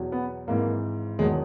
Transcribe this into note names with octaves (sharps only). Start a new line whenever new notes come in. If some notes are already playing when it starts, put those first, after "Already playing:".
Already playing: E2 B2 F#3
B3
G#1 G#2 E3 A#3
E1 E2 D#3 F#3 G#3